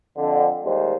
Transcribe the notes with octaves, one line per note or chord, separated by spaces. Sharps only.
F2 D3
D#2 G3 G#3 C5